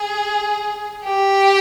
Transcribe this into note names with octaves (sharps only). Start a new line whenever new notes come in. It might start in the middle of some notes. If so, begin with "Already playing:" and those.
Already playing: G#4
G4